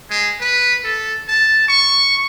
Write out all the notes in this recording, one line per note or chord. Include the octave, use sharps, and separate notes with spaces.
G#3
B4
A4
A5
C#6